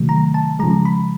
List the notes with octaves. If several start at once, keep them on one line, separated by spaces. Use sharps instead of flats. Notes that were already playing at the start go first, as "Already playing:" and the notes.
Already playing: C3 D#3 F#3 A3
A#5
A5
C#3 F3 G#3 A#5
B5